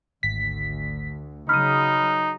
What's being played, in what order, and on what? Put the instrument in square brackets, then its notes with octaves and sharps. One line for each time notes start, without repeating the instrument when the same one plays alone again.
[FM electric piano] G#1 B6 [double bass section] D2
[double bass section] C#3 F#3 [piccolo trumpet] D#4 [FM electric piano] B5 D#6 [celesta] F6